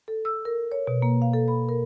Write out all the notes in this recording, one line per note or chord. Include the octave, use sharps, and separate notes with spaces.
A4
E6
A#4
C#5
B2
A#3
F5
A4
B5
A#4